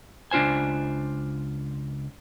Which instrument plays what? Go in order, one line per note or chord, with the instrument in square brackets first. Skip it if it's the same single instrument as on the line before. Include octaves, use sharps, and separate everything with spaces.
[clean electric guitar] C#2 D4 F4 C5 G#5